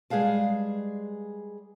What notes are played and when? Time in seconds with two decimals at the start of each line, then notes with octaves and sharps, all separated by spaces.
0.10 G3 G#3 G#4 B4 F5 A5